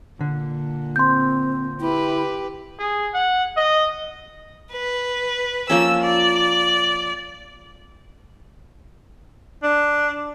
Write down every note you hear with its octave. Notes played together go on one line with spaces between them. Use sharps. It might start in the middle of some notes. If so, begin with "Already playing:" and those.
A#2 D3
C4 C6 G6
E4 G4 B4
G#4
F#5
D#5
B4
F3 A#3 C#4 E6
D5
D4